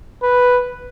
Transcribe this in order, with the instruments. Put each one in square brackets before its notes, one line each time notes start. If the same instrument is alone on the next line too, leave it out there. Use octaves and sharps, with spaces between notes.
[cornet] B4